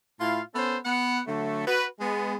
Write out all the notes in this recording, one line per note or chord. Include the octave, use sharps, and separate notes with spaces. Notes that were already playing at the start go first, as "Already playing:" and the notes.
A2 E4 F4 F5
B3 C#4 A4 C5
B3 F#5
D3 F#3 A3
F#4 B4
G#3 B3